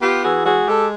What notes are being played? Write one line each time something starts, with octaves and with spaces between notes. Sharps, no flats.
B3 F4 G4
E3 F#4 G#4
G#3 F#4 G#4
G#3 G4 A4